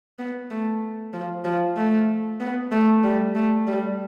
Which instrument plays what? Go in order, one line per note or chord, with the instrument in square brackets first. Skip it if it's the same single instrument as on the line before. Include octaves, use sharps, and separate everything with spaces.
[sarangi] B3
A3
F3
F3
A3
B3
A3
G3
A3
G3